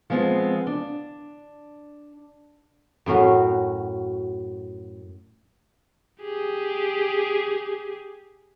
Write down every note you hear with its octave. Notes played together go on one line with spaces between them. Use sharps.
F3 G#3 B3 C4
D4
F#2 A2 C#4 F#4
G4 G#4